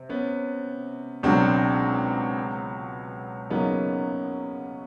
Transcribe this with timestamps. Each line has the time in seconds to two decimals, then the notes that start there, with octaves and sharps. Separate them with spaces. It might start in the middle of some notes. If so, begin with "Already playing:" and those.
Already playing: C3
0.09 B3 C#4
1.23 C#2 B2 F#3 C4 D4
3.50 F#2 C#3 F#3 A#3 B3 C#4 D#4